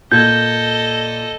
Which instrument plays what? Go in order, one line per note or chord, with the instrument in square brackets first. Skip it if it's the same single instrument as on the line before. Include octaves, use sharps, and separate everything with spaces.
[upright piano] A#2 G#6 [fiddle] A4 D#5 [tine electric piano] G6